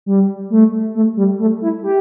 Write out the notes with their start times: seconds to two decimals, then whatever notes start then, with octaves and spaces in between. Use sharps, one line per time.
0.06 G3
0.50 A3
0.95 A3
1.17 G3
1.40 A3
1.62 E4
1.83 G4